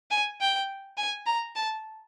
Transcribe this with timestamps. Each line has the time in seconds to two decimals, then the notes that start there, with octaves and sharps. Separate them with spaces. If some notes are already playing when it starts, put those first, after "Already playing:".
0.11 G#5
0.41 G5
0.97 G#5
1.26 A#5
1.56 A5